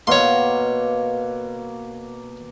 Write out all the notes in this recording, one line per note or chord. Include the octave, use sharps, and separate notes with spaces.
B2 A#3 C#5 C6